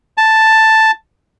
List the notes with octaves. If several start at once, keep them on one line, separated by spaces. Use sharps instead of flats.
A5